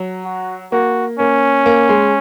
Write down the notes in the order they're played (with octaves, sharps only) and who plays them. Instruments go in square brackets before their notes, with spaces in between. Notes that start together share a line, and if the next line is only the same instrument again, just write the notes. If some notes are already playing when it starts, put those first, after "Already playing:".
Already playing: [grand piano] F#3
[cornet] F#4
[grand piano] A#3 [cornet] F#4
[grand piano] A#3 [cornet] C#4
[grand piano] A#3
G#3